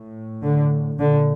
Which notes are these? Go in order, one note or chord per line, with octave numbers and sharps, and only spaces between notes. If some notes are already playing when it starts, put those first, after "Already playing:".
Already playing: A2
D3
A#2 D3